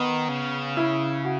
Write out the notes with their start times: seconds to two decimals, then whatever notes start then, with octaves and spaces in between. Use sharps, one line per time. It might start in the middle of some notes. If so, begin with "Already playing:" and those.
Already playing: D#3 B3
0.29 C#3
0.77 E4
1.25 F#4